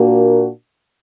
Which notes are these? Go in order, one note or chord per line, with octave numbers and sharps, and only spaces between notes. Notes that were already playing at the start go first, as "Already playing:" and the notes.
Already playing: A#2 A#3 D4 F#4 A#4